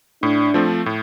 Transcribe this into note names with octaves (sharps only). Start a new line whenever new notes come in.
A2 D4
F3 A3 C4
A2